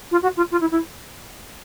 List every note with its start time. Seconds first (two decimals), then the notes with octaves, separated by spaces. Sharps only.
0.11 F4
0.22 F#4
0.36 F4
0.51 F4
0.60 E4
0.71 E4